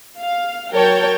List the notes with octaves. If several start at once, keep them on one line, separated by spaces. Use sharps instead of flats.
F5
F#3 A#4 C#5 G5 A5